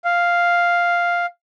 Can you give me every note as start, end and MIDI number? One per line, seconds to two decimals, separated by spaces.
0.05 1.26 77